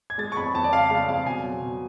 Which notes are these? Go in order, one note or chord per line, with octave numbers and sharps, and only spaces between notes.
G#6
G#3 A6
C#6
F2 B5
F2 A5
D5
C#3 F5
G#3 F5
F2 F5
B2 G#5
F#3
B2